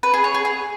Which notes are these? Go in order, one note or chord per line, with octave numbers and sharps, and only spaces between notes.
B4
G#4
C#5
G#4
G#4